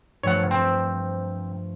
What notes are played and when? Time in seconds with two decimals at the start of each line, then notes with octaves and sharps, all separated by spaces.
0.23 G2 F3 A3 C#5 F#5
0.51 C4 G6